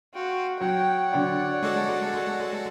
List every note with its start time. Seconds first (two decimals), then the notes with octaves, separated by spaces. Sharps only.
0.15 F#4 F5 G5 C6
0.60 F#3 C#5 F#5 G5
1.13 D3 F#3 D5 G5
1.63 G#3 F#4 A4